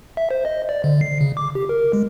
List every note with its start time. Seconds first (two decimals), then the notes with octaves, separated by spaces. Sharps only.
0.17 E5
0.31 C5
0.45 D#5
0.69 D5
0.84 D3
1.01 C7
1.21 C#3
1.37 D6
1.55 G4
1.69 A#4
1.93 G#3